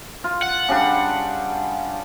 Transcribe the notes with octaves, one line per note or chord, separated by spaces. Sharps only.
F4
F#5
C#3 G3 D4